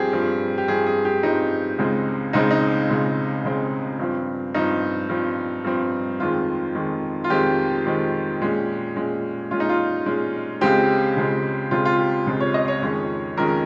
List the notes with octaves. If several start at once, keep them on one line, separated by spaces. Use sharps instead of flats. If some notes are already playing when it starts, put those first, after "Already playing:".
Already playing: G2 F3 C4 G4 G#4
G2 F3 C4
G4
G2 F3 C4 G#4
G#4
G4
G2 F3 C4 D#4
C#2 C#3 G#3 C4
C#2 C#3 G#3 C4 D#4
D#4
C#2 C#3 G#3 C4
C#2 C#3 G#3 C4
G2 F3 C4
G2 F3 C4 D#4
G2 F3 C4
G2 F3 C4
F2 D#3 G#3 C4 F4
F2 D#3 G#3 C4
F4
F2 D#3 G#3 C4 G4
F2 D#3 G#3 C4
A#2 G#3 C#4
A#2 G#3 C#4
A#2 G#3 C#4 F4
D#4
F4
A#2 G#3 C#4
C#2 C#3 G#3 C4 G4
C#2 C#3 G#3 C4
C#2 C#3 G#3 C4 F4
F4
G4
C#2 C#3 G#3 C4
C#5
D#5
C#5
F2 D#3 G#3 C#4
F2 D#3 G#3 C#4 A#4